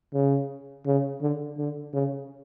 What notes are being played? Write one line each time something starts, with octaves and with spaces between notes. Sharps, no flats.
C#3
C#3
D3
D3
C#3